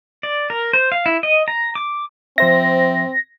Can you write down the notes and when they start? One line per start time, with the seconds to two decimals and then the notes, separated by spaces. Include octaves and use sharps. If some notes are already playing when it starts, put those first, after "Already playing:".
0.23 D5
0.50 A#4
0.73 C5
0.92 F5
1.06 E4
1.23 D#5
1.48 A#5
1.75 D6
2.38 F3 C4 C5 E5 A#6